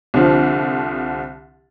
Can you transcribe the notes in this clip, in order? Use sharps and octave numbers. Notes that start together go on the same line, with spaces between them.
C2 D3 F3